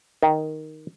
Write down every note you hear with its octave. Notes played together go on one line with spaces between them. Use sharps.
D#3